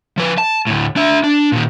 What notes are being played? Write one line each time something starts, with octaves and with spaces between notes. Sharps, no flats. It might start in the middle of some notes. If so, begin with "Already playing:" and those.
F3 B4
A5
D2 A2
D4 E5
D4
A#2 D#3